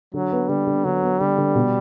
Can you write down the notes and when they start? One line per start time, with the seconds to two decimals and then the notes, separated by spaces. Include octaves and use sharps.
0.14 D3 F#3
0.32 B3
0.49 D3 G3
0.67 D3
0.85 D3 F#3
1.03 B3
1.19 D3 G3
1.38 D3
1.55 B2